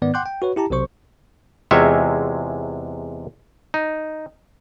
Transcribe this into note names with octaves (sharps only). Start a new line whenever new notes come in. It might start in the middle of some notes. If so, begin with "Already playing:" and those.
G#2 D#3 B3 D5
F#5 G5 C6 D6 F#6 G6
G5
F#4 B4 C#5
E4 G4 A5 A#5
B1 C3 F#3 C5 C#6
E2 C3 G#3 F4 C#5 E5
D#4